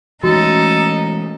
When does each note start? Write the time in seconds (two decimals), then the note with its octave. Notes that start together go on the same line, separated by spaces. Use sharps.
0.23 E3 G#3 A3 C#4 D#4 F#4 A4